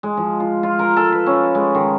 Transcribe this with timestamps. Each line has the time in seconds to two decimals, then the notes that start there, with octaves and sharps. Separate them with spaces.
0.03 G#3
0.17 F3
0.40 F4
0.63 F4
0.79 A#4
0.97 A4
1.12 B4
1.26 C#4
1.55 G#3
1.75 D#3